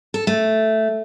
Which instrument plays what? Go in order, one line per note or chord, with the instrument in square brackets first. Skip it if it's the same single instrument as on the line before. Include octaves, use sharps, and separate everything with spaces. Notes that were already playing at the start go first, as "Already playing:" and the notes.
[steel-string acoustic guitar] A4
A3